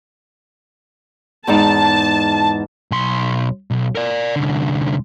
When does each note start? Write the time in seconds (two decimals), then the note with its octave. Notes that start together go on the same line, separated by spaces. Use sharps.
1.47 E2 G#2 D#4 A5
2.91 B1 C6
3.71 B1
3.95 A#4 D5
4.36 C2 D3